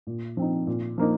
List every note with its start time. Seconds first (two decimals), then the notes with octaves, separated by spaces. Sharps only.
0.07 A#2
0.37 F3 C4 D#4
0.67 A#2
0.98 F3 A#3 D#4